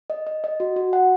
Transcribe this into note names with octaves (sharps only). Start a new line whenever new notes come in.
D#5
D#5
D#5
F#4
F#4
F#5